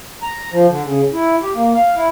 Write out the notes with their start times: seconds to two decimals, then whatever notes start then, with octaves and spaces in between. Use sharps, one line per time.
0.23 A#5
0.52 F3
0.69 D3
0.84 C#3
1.13 E4
1.42 G4
1.54 A#3
1.74 F5
1.96 E4